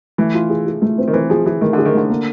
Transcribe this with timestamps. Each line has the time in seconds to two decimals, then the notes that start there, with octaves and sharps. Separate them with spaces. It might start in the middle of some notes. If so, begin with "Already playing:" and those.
0.18 E3 A3
0.34 F4
0.50 G#4
0.67 G#4
0.82 A3
0.98 C4
1.08 D#3
1.13 E3 C4
1.30 F3 G#4
1.46 E3 G#4
1.61 D#3 A3
1.73 D3 G#4
1.86 D#3
1.94 D3 A3
2.10 A#3